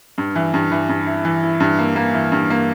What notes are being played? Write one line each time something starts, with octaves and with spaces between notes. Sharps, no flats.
G2
E3
G2
E3
G2
E4
E3
E4
G2
A#3
A#3
E3
G2
A#3